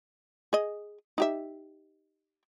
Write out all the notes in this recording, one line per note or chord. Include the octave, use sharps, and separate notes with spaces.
G#4 D#5
D#4 G4 E5